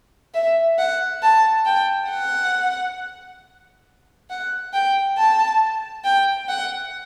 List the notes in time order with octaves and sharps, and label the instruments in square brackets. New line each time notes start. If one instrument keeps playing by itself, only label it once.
[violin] E5
F#5
A5
G5
F#5
F#5
G5
A5
G5
F#5